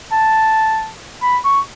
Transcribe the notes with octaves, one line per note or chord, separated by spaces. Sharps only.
A5
B5
C#6